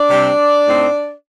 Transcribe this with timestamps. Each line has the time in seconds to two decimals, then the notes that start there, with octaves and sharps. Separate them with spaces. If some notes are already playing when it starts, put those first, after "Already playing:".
Already playing: D4 D5
0.10 C3 G3 C4
0.67 A2 A3 C4 D#4